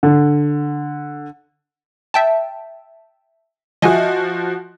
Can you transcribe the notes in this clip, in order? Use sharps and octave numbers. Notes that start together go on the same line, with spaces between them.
D3
E5 G5 A5
F3 F#4 D#5 E5 G#5